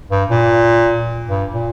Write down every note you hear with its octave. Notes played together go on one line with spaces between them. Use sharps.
G2
A#2
G2
A#2